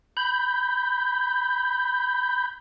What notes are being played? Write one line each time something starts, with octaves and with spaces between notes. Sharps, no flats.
B5 G6